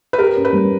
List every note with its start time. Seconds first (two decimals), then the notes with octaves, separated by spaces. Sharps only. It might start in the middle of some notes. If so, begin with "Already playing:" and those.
0.13 B4
0.19 G4 A#4
0.36 C#4
0.45 B4
0.53 G3